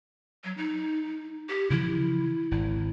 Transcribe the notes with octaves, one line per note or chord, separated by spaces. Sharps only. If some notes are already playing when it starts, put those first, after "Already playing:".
F#3
D#4
G4
C#3 E3 F3 E4
G#1 E4